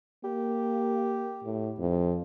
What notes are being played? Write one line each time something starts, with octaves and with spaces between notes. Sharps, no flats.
A#3 G4
A2
F2